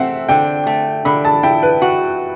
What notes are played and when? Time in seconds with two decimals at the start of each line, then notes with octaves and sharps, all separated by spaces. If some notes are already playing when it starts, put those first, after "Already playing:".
Already playing: A3 C4 E5 F#5
0.29 D3 G5
0.66 A3
1.05 D3 B5
1.25 A5
1.43 E4 G5
1.63 B4
1.82 F#4